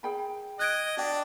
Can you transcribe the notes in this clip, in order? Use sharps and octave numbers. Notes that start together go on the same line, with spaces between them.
G#4 G5 B5
D#5 F#6 G#6 D7
D4 F#4 G5